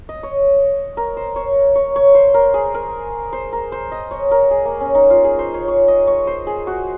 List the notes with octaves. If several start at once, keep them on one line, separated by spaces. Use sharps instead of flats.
D#5
C#5
A#4
C5
C#5
C#5
C#5
C5
A#4
G#4
A#4
C5
A#4
C5
D#5
C#5
A#4
G#4
A#3
C#4
D#4
F4
G#4
C5
C#5
C#5
D#5
C#5
C5
G#4
F#4